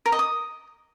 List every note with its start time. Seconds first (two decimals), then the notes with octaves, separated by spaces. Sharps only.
0.06 A#4
0.12 D#5
0.19 D#6